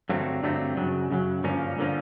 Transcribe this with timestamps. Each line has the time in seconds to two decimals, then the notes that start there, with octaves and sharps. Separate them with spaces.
0.09 G2 D3 F#3 A3 C4
0.43 G2 D3 F#3 A3 C4
0.77 F#2 C#3 F#3
1.11 F#2 C#3 F#3
1.43 G2 D3 F3 A#3 C#4
1.78 D3 F3 A#3 C#4